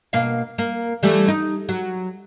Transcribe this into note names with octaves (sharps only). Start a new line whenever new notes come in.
B2 A#3 F5
A#3
E3 G3 A3
D#4
F#3